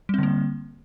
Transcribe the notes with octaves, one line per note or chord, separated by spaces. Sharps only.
D3 G3 A#3 C4